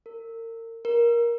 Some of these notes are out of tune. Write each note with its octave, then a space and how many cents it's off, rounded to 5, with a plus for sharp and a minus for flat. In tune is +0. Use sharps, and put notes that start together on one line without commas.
A#4 -35
A#4 +15